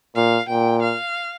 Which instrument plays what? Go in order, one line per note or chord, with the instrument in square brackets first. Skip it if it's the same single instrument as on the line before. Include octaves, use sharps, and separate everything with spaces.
[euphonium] A#2 [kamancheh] F5
[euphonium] A#2 [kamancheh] G5
[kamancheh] F5